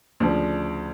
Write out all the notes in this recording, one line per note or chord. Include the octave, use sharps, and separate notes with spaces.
D2 C#3 F3 D5